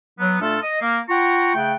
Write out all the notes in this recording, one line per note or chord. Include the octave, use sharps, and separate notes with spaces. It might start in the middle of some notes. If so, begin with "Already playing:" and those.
F#3 B3
A#2 A3 D4 F4 A4
D#5
A#3
F4 F#5 G5 A#5 C#6
C#3 A3 F#5 G5